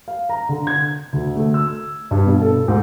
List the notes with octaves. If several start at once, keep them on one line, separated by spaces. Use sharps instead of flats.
F5
A#5
D3
G#6
D2
A3
E6
G2
B2
A4
G#2